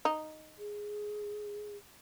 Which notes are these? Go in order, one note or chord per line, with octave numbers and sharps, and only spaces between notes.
D#4
G#4